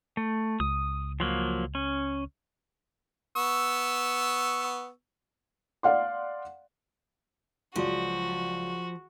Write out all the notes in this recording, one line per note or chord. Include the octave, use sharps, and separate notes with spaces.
A3
C#2 D#6
F3 F#3 A#3
C#4
B3 C#6 E6
D5 F5 F#5 C6
C#2 F3 F#3 F#4 D5